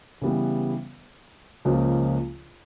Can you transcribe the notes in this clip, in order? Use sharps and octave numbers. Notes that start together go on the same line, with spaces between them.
C#3 E3 G3 B3
C#2 C#3 F3 A#3